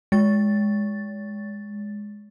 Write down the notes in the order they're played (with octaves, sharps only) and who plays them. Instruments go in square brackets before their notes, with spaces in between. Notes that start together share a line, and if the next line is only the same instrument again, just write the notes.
[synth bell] G#3 A6